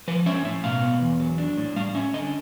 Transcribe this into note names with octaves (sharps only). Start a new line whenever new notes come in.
F3 B4
C#4 E5
A2 E5
B2 F5
B3
E2
F#3
D4
A2
G3 F5
C#4 E5
D3 D#5